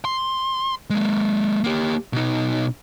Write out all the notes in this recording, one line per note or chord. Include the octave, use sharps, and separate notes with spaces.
C6
G#3 A#3
A#3 G4
B2 D#4